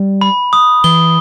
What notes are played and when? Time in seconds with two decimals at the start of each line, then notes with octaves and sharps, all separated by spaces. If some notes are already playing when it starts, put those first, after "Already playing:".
Already playing: G3
0.21 B5
0.53 D#6
0.84 E3 G7